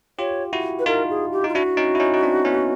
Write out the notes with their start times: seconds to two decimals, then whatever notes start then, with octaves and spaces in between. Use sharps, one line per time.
0.19 F4 G4 C#5
0.53 E4 F#4
0.79 B4
0.86 D#4 F4 A#4
1.10 G#4
1.32 G4
1.44 D#4 F4
1.54 D4 E4 F#4
1.77 C#4 D#4
1.95 E4
2.00 C#4 D#4
2.14 D#4
2.23 C4 D4
2.45 B3 C#4